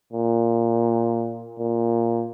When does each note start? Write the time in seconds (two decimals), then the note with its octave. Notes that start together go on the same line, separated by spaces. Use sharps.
0.13 A#2
1.59 A#2